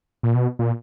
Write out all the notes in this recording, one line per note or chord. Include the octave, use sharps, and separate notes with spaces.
A#2
B2
A#2